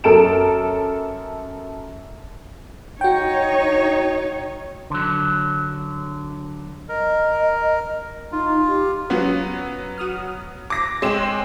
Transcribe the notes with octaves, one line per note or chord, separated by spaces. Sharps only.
F#2 A4 A#4 A5 D7 E7
D#4 F#4 C#5 G5
D3 F#3
A#4 D#5
D#4 F4
G4
F#3 B3 C#4 F4 F#4
F#4 D#6 F6
D6 A#6
G#3 C4 C#5 E7